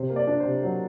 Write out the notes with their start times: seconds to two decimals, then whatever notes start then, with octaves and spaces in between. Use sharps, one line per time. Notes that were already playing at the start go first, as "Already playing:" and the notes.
Already playing: C3 C5
0.10 A#3
0.16 D5
0.27 D4
0.40 C3 C5
0.63 F#3